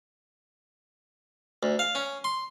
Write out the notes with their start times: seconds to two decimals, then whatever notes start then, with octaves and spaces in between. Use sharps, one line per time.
1.63 D2
1.79 F5
1.95 C#4
2.24 C6